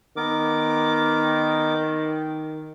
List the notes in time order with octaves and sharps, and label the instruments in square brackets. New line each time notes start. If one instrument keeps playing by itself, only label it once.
[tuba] D#3 [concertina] B3 A#4 D6